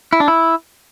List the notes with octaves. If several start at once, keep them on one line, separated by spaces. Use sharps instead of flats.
E4
D4
E4